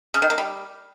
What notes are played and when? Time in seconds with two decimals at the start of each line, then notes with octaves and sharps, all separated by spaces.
0.14 C#3
0.22 D#3
0.30 A#3
0.38 G3